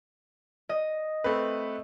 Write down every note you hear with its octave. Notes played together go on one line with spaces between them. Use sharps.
D#5
A3 C4 B4